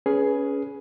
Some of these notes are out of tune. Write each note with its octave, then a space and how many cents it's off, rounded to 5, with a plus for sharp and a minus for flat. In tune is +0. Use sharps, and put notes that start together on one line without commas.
C#4 +20 G#4 +10 B4 -10